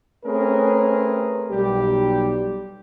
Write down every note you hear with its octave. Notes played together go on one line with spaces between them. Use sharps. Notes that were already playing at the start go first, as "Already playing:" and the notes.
A3 C4 C#4 G#4 A#4 B4
B1 G3 G4